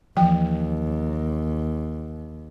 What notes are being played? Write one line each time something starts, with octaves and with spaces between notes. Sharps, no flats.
D#2 E3 F3 G5